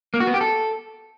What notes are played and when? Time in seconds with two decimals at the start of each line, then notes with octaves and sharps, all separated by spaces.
0.14 A#3
0.20 F#4
0.27 B3
0.34 G4
0.41 A4